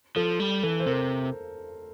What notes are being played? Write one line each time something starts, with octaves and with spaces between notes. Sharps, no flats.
F3 A4
G3
E3 A4
C5
C3 A#4